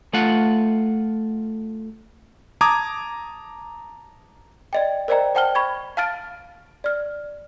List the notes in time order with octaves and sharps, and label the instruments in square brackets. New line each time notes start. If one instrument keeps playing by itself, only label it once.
[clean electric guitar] A3 F4 F#5
[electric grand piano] A5 A#5 D6 D#6 G#6
[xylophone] D5 D#5 G5
A#4 C5 D5 D#5 G5 A#5
C5 F#5 G5 A5 F6 G7
B5 C#6 G#6
F5 A5 F6 A6 D7
D5 F6